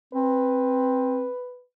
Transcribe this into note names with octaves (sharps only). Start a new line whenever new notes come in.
C4 B4